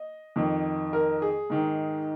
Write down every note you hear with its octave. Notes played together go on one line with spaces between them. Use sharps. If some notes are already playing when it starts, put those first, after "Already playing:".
Already playing: D#5
F2 D#3
A#4
G#4
G#2 D#3